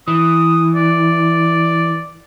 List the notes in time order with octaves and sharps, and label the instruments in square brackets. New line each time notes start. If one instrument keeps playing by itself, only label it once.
[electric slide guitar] E3 [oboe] D#6
[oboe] D5